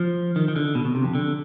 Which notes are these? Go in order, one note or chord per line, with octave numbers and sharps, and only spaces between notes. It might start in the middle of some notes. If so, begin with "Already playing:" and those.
Already playing: F3
D#3
D#3
D3
B2
B2
C3
F2
D3